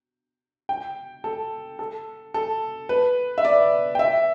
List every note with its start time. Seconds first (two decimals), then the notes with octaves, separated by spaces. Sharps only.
0.69 G5
1.24 A4
1.79 A4
2.34 A4
2.89 B4
3.38 E5
3.45 D5
3.95 G5
3.99 E5